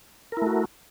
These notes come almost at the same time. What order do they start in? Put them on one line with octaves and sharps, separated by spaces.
A#4 E4 A3 F#4